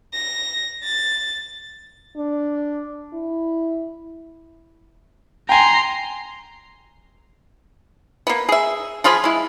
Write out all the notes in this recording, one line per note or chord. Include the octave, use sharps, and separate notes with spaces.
A#6
A6
D4
E4
G5 G#5 A#5 C6
A#3 B3
G#4 E5
F3 F4 G#4 B5
G#3 E4